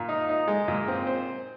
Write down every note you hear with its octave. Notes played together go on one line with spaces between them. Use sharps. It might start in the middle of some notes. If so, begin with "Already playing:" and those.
Already playing: A#2
D#4
D#4
G#3
A#2
C4
C5